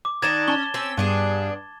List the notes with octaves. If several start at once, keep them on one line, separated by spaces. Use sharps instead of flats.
D6
D#3 D4 D#4 G#6 A6 E7
C#4 A5 G7
C4 C#4 G4 E6
G2 B3 D4 G#4